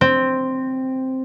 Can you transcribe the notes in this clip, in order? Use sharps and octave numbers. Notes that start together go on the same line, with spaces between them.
C4